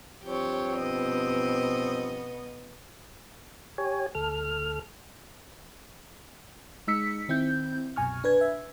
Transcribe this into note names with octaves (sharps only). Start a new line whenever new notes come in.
G2 F3 C4 G4 C#5
B2 B3 D#5
G4 C#5 G#5
D2 A4 F6
G#3 D#4 E6 B6 C#7
D#3 C4 E4 G6
C2 F#2 B2 G#5 C#6 F6
D4 B4 G#6
E5